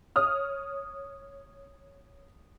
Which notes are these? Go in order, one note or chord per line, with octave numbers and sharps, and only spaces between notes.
C#5 D#6 F6